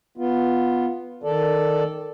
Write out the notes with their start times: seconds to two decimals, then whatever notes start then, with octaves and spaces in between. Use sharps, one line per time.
0.17 B3 F4
1.23 D#3 A4 D5